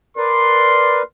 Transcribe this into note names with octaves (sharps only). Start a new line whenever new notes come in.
A#4 B4 D5 C6